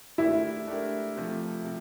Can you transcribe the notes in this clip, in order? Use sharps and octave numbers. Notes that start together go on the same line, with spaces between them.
A3 D4 E4 G4 A#4
A3 D4 G4 A#4
C3 F3 A3
C3